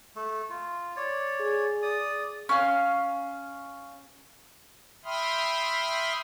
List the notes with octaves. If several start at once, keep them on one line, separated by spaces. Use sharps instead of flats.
A3
F4
C#5 D5
G#4
D5 D#6
C#4 F5
E5 G5 B5 C6 D#6 F6